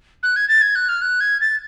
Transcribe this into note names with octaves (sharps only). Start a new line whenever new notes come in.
F#6
G#6
A6
G#6
F#6
F6
F#6
G#6
A6